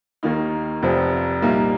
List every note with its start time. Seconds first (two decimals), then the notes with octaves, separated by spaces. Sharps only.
0.23 D#2 D#3 A#3 D#4
0.82 F1 F2 C3 F3 C4
1.42 C2 A#2 G3 A#3 D#4